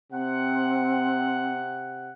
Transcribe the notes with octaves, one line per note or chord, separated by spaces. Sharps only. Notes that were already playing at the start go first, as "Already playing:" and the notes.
C3 C4 F#5